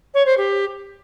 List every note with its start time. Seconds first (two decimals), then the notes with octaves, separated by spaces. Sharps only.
0.14 C#5
0.26 C5
0.38 G4